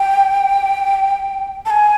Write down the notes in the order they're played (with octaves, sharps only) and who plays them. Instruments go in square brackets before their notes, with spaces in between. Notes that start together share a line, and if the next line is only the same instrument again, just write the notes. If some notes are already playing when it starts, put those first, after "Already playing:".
Already playing: [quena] G5
A5
G#5